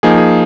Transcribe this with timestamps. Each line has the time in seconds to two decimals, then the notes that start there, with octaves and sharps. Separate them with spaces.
0.03 F3 A#3 D#4 G#4
0.18 G#4